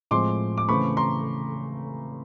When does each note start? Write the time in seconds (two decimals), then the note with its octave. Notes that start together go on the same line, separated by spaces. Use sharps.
0.11 A2 F3 G#3 C4 C6 D6
0.58 D6
0.68 C#3 E3 A3 C4 B5 C#6
0.97 A#5 C6